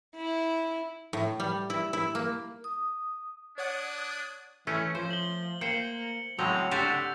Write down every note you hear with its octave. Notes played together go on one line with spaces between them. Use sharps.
E4
A2
G3
E4
E4
A#3
D#6
D4 C#5 D5 F#5 D#6 F#6 G#6
E3 A3 C#4
F3 C5
F#7 G7
A#3 C5 G5 C#7 F#7
A2 C#3 F#3 G#3 C4 F7 G7
D3 F#4 G4 C5 E6 A6 B6